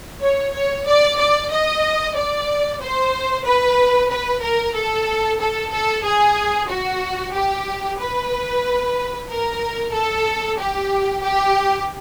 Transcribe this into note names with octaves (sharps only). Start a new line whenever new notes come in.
C#5
C#5
D5
D5
D#5
D5
C5
B4
B4
A#4
A4
A4
A4
G#4
F#4
G4
B4
A#4
A4
G4
G4